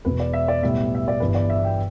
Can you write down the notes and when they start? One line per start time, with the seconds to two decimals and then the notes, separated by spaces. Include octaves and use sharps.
0.05 E1 E2 B2 B3 B4
0.20 D5
0.33 E5
0.48 D5
0.63 B1 A2 G3 B3 E5
0.95 E5
1.08 D5
1.20 G1 G2 E3 G3 B3 B4
1.35 D5
1.50 E5
1.65 G5